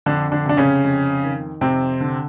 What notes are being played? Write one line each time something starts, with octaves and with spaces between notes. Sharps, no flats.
F2 D3 D4
D3 D4
C3 D4
C#3 C#4
F2
D#3
F2 C3 C4
D3